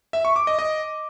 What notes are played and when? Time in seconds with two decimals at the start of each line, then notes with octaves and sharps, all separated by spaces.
0.13 E5
0.25 C#6
0.36 D6
0.47 D#5
0.59 D#5